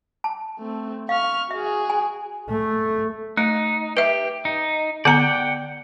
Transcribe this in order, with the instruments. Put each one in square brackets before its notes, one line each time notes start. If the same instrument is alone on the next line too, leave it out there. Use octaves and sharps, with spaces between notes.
[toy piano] A5
[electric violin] A3 C4
[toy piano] F5 [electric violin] C#6 F6
[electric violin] F#4 G#4 [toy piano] E5
[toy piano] G#5
[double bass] A3
[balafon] A3 [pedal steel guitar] D#4
[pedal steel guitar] G4 [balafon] B4 E5
[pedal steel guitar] D#4
[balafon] D3 B3 A#5 [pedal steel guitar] D5 F#5 G5